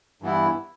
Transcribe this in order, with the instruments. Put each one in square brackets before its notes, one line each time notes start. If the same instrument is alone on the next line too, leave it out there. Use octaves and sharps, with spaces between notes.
[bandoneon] G2 E3 B3 E4